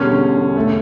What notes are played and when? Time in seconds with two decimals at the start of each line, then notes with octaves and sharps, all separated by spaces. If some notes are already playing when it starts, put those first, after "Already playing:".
Already playing: E1 E2 D3 G3 C#4
0.56 E1 C#3 A3